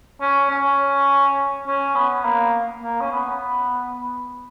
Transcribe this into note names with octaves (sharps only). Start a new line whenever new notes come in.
C#4
C#4
C#4
B3
A#3
A#3
C#4
B3